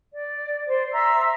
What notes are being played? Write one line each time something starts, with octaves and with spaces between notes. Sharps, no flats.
D5
C5 D5
E5 A#5 C6 E6